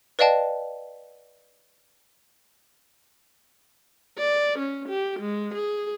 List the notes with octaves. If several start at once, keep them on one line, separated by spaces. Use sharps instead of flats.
B4 D5 D#5 F5 G5 A5
D5
C#4
G4
G#3
G#4